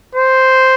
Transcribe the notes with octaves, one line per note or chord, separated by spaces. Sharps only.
C5